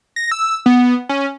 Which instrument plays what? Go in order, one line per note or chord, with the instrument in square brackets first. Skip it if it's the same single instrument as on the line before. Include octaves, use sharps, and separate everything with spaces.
[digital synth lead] A#6
E6
B3
C#4